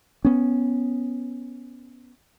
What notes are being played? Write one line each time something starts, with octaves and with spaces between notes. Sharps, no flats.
B3 C#4